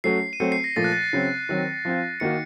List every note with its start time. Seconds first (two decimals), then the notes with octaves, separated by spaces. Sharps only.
0.04 F#3 A3 C#4 F#4 C7
0.33 D#7
0.40 F#3 A3 C4 F#4 C#7
0.52 C7
0.64 A#6
0.76 A#2 F3 A3 A6
0.84 F#6
0.92 A6
1.13 C#3 F#3 C4
1.49 D#3 F#3 C4
1.85 F3 C4 F4
2.20 D#3 A#3 D#4 F#4 C#7